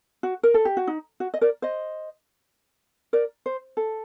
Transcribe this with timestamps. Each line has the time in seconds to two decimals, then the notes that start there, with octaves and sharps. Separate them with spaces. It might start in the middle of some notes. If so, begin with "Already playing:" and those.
0.23 F#4
0.43 A#4
0.54 A4
0.65 G4
0.77 F#4
0.87 D#4
1.20 F#4
1.34 D#5
1.41 A#4 D5
1.62 C5 D#5
3.13 A#4 D5
3.46 C5
3.77 A4